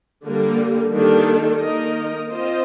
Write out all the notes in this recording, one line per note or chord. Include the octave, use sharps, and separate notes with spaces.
D3 G3 A#3
D#3 G3 A#3 D4 A4
D#3 A#3 D#4 A#4 D#5
C4 F4 C5 D#5